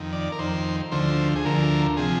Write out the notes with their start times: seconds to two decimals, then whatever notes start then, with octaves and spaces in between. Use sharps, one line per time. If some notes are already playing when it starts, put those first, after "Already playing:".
Already playing: F2 D#3
0.13 D5
0.32 A#4
0.39 F2 D#3 C5
0.92 D2 D3 F3 C5
1.36 G#4
1.45 D2 D3 F3 A#4
1.97 C3 F3 G#4